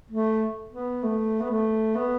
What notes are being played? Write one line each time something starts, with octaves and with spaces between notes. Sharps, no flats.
A3
B3
A3
B3
A3
B3